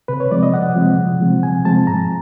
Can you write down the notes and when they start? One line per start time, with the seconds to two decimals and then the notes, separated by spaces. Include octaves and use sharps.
0.08 C3 B4
0.20 C#5
0.31 F3 G#3 C4 D5
0.43 D#5
0.53 C3 F#5
0.76 F3 G#3 C4
0.98 C3
1.20 F3 G#3 C4
1.43 C3 G#5
1.65 F3 G#3 C4 A5
1.87 G#2 A#5